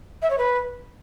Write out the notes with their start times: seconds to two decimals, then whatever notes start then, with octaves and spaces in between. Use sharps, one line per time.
0.22 E5
0.30 C#5
0.38 B4